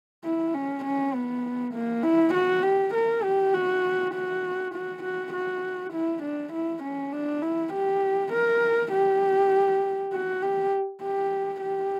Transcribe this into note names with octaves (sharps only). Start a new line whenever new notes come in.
E4
C#4
C#4
B3
A#3
E4
F#4
G4
A#4
G4
F#4
F#4
F#4
F#4
F#4
E4
D4
E4
C#4
D4
E4
G4
A#4
G4
F#4
G4
G4
G4